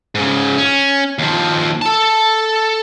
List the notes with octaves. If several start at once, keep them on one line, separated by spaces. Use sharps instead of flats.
G#2 C#3
C#4
D#2 F3
A4 A5